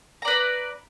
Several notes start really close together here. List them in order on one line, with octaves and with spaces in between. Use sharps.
A#5 D5 B4